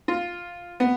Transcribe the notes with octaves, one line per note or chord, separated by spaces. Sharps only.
F4
B3